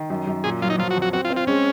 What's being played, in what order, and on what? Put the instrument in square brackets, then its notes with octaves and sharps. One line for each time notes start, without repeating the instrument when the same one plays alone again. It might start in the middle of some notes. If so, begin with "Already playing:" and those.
Already playing: [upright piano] D#3
F#2
F#2
[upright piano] A#2 [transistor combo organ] G#4
[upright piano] F#3 [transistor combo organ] F4
[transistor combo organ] D#4
[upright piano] F3 [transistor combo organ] F4
[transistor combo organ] F#4
[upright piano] F2
[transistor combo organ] F#4
[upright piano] C4 [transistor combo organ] F#4
[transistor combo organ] F4
[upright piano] C4
[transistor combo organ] F4
[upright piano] G#3 [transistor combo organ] C#4